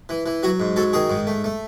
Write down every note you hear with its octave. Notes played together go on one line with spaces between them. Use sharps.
E3
E3
F#3 F#4
G#2
F#3 A4
D#3 G#4
G#2
A3
A3